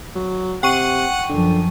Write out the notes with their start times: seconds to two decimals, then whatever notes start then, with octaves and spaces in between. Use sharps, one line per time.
0.15 F#3
0.63 C3 F#5 G5 C#6 D#7
1.29 F#2 D3 F3